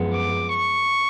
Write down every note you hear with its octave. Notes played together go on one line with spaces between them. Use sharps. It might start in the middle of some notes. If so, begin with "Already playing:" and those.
Already playing: F#2 F3 G#3 B3
D6
C#6